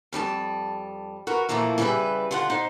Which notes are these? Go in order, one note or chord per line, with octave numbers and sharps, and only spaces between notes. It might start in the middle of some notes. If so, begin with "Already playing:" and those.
F2 G3 G4 A5
F#4 A#4 B4
A#2 E3 F3 A3 A#3 E4
C#3 E3 G3 G#4 B4 E5
D3 F4 F#5
D#4 C5